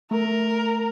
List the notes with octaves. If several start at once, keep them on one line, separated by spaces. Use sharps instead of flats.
A3 A#4